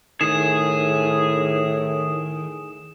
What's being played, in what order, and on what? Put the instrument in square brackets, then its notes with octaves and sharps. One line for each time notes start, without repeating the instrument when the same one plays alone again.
[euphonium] A2 [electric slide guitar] D#3 [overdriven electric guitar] G#4 [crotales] E7